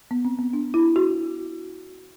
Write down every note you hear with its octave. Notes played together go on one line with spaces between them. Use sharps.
B3
C4
B3
D4
E4
F#4